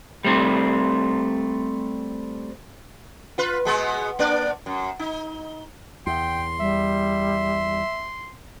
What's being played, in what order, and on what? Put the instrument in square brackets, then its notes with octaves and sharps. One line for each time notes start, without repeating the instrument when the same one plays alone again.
[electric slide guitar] G3 A3 C4
[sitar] F4 B4
B2 G#3 B3
A#3 D4 D5
F#2
D#4
[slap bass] E2 [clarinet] G5 [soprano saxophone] C6
[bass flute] G3 [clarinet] E5